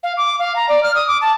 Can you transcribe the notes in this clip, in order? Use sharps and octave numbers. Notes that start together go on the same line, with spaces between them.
F5
D6
F5
A#5
D5
F6
D#6
D6
A5